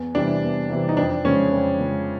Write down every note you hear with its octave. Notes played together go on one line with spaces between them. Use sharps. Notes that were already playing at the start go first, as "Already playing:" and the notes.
Already playing: E2
C3 E3 G3 D4
E2
C3 E3 G3
D#4
F2 D4
C#3 F3 G#3 C#4
F2
C#3 F3 G#3